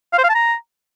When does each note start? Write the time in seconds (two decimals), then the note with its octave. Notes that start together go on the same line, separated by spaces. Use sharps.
0.13 F5
0.18 C5
0.24 F5
0.29 A5
0.35 A#5